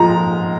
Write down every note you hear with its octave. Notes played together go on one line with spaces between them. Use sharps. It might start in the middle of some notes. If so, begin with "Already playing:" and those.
Already playing: A#2 F3 G#3 A#5